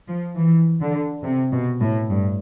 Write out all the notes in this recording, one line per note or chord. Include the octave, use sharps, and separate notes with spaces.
F3
E3
D3
C3
B2
A2
G2